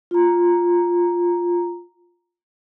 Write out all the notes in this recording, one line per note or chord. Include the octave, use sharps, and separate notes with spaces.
F4 A#5